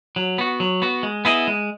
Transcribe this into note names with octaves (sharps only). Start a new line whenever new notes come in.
F#3
B3 F#4
F#3
B3 F#4
G#3
B3 E4 G#4 D#5
G#3